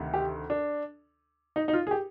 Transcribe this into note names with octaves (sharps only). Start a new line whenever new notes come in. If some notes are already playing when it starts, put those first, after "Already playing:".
Already playing: D2 C3 D#3
G4
D4
D#4
D#4
F4
G#4
G4